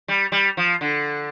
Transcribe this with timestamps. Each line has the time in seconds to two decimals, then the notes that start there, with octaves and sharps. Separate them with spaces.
0.08 G3
0.32 G3
0.57 F3
0.81 D3